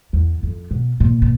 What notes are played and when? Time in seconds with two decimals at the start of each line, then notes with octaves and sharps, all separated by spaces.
0.13 E2
0.43 F2
0.71 B2
1.00 A#2
1.22 A#2